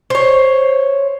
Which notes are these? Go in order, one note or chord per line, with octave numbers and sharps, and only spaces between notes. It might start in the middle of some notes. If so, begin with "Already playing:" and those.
C5 C#5